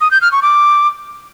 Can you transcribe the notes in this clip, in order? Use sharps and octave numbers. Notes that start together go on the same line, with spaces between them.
D#6
G6
F6
C#6
D6